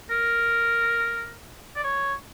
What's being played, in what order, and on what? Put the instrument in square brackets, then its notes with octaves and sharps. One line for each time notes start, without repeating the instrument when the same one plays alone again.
[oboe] A#4
D5
C#5